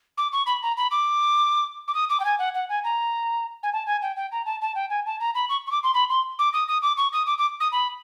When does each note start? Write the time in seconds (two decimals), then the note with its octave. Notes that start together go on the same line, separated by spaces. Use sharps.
0.17 D6
0.32 C#6
0.46 B5
0.62 A#5
0.77 B5
0.91 D6
1.87 D6
1.94 D#6
2.09 D6
2.19 G5
2.25 G#5
2.38 F#5
2.54 F#5
2.69 G#5
2.84 A#5
3.63 G#5
3.73 A5
3.86 G#5
4.02 G5
4.16 G5
4.32 A#5
4.45 A5
4.61 A5
4.75 G5
4.90 G#5
5.06 A5
5.20 A#5
5.35 B5
5.49 C#6
5.66 C#6
5.71 D6
5.83 C6
5.94 B5
6.09 C6
6.39 D6
6.53 D#6
6.68 D#6
6.82 D6
6.97 C#6
7.12 D#6
7.26 D6
7.38 D6
7.60 D#6
7.72 B5